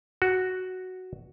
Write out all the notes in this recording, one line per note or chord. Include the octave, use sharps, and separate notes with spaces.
F#4